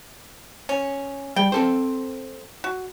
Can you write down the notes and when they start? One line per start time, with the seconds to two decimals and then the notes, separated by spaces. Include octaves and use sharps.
0.69 C#4
1.36 G3 G5
1.52 C4 A4 C5
2.64 F#4